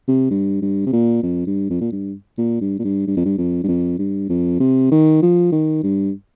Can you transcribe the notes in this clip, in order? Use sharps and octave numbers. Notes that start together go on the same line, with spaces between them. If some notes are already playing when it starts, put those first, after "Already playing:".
C3
G2
G2
C3
A#2
F2
G2
F2
A#2
G2
A#2
G2
A#2
G2
G2
F2
G2
F2
G2
F2
G2
F2
C3
D#3
F3
D#3
G2